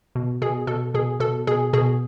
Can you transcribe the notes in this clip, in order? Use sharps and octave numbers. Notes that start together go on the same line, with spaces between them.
B2
B2 G#4
B2 A4
B2 G#4
B2 A4
B2 G#4
B2 G#4